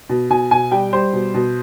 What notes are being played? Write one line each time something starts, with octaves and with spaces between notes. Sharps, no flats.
B2
B2 G#5
B2 G#5
G3 G5
G3 C5
B2
B2